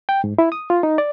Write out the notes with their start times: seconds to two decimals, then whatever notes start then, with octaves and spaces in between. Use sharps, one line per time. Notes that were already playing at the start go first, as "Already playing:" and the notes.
0.09 G5
0.24 G#2
0.39 E4
0.52 D#6
0.70 F4
0.83 D#4
0.98 D5